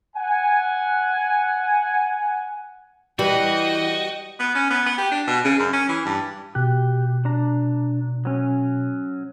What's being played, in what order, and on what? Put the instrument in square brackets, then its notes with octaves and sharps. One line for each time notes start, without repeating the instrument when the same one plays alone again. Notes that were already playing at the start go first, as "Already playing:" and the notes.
[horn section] F#5 G#5
[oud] E3 [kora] G3 [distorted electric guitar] F#4 [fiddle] D#5 G5
[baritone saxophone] B3
C#4
B3
B3
G4
D4
B2
C#3
F#2
C#4
E3
G2
[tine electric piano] B2 F#6 [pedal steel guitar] G4
[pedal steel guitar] D4 A#5
F#3 C#4